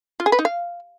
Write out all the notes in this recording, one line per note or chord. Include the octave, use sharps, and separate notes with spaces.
F4
G#4
B4
D#4
F5